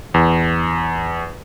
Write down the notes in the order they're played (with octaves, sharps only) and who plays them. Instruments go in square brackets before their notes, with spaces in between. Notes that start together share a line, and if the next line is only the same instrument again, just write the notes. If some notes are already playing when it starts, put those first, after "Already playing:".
[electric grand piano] E2